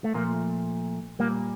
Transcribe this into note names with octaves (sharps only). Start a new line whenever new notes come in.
A3
A#2 F3 A3 A#3
A#2 G3 A#3